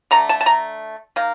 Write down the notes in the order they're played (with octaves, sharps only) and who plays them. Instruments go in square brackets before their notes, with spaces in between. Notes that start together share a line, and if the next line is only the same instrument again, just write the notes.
[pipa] D3 A3 A#5
A5
A5
A#5
D#3 A#3